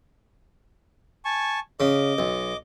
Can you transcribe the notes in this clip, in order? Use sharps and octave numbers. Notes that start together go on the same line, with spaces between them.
G#5 A5 C#6
C#3 D#5 D6
B1